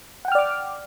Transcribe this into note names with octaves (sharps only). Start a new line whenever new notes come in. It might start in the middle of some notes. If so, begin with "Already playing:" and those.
D5 F#5 G5 D6 F6